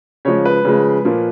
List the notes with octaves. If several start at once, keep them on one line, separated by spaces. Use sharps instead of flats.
C#3 F3 G#3 C#5
B4
C#3 F3 G#3
A#2 F3 A#3